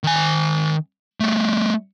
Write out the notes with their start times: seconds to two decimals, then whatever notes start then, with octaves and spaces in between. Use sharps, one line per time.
0.04 D#3 G#5
1.20 G3 A3